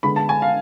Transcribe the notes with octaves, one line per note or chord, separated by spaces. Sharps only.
D3 G#3 B3 B5
A5
G#5
F5